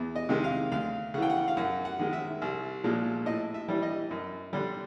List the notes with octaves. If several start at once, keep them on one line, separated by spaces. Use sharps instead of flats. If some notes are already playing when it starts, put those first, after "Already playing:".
Already playing: E2
D#5
C3 D#3 G#3
F5
D2 F5
C#3 E3 F#5 G5
F#5
F5
F#2 F#5
F#5
D#3 G#3
E5
C2
A#2 F3 G#3
A2 D#5
E5
E3 G3
D#5
F#2
D3 G3